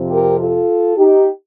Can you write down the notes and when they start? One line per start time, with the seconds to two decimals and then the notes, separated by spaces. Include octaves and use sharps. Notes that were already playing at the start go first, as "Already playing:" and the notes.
Already playing: F2 C3 F3
0.11 G4 A#4
0.40 F4 A4
0.97 D#4 G4